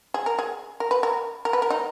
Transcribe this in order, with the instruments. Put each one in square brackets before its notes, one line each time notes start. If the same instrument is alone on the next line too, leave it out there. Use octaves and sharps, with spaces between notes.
[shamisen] G#4
A#4
G#4
A#4
B4
A#4
A#4
B4
A#4
D#4